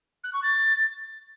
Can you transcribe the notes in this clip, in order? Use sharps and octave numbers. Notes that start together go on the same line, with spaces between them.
F#6
C#6
A6